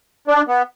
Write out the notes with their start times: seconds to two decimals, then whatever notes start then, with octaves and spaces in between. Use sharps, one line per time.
0.28 D4
0.48 B3